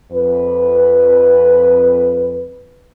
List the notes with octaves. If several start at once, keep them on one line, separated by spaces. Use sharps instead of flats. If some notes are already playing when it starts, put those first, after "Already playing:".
F2 B4